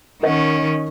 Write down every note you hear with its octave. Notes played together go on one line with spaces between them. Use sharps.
D#3 C#4 A#4 D#5 F#5